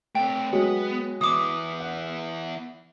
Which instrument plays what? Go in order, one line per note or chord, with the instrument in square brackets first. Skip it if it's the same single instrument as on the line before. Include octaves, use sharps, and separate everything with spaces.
[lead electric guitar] A3 C4 [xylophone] G5
[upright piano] F#3 G#3 F#4 [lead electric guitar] B3
[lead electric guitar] E3 B3 [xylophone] D6 D#6
[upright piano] F#5